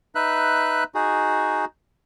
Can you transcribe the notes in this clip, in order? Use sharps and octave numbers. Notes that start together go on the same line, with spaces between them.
D#4 B4 E5 F#6
D#4 F#4 G#4